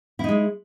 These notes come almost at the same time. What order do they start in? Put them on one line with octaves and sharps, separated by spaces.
E4 D#4 G#3